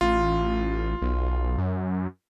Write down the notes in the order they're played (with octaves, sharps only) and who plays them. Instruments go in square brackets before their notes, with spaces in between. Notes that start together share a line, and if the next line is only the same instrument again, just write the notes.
[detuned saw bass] A1 [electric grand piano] F4
[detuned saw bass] B1
F#2